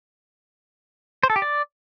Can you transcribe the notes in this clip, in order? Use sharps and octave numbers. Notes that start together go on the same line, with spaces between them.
C5
A4
G4
D5